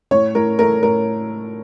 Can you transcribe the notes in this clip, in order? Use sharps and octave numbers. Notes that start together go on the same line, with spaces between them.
A2 C#5
A2 A#4
A3 A#4
A2 A#4